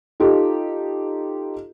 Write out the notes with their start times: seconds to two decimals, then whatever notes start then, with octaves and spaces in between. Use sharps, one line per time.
0.20 D#4 F4 G4 A4